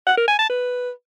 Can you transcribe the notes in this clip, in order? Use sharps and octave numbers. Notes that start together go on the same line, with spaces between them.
F#5
A#4
G#5
A5
B4